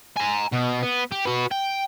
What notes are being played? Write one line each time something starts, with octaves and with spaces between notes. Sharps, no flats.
G#5 A#5
B2
B3
G4
F#4 B4
G5